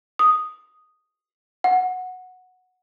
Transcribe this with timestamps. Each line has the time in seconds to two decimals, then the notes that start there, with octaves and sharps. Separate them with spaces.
0.19 D#6
1.64 F#5